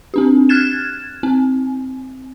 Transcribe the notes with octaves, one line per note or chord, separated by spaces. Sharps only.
C4 D4 G4
F6 F#6 G#6 A6 E7
C4